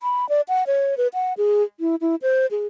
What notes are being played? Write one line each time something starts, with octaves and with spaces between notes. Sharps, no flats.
B5
D5
F#5
C#5
B4
F#5
G#4
E4
E4
C5
G#4